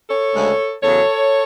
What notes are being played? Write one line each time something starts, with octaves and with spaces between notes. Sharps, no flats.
A4 C#5
D2 C#3 G#3
E2 C#3 F#3 A4 C#5